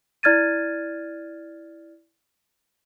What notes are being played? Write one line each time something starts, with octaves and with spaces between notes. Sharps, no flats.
E4 D5 F6 G#6 A6 D#7